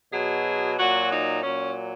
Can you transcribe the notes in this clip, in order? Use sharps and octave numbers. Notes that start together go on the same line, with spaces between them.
B2 F#3 G#4
A#2 F#3 F#4
D#4
A#2 F#3 C#4